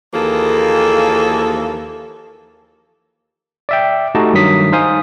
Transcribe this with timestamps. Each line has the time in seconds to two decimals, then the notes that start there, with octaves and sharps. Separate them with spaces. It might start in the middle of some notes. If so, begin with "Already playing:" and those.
0.14 D#2 E3 F3 A#3 G#4 A4
3.69 D5 E5 G5
4.15 A3 D#4 F#4 G4 D#5 A5
4.34 G2 D#3 F#3 D#6 B6
4.72 D#4 C5 F5 G#5 D#6